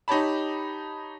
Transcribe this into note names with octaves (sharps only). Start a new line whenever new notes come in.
D#4 G4 C#5 A5 B5